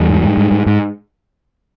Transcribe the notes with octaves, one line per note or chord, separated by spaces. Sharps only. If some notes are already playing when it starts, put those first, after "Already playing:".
Already playing: E2 G3
G#2
G#2
G#2
G#2
G#2